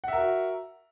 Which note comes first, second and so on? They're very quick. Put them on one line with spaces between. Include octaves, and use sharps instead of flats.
F#5 E5 A#4 F#4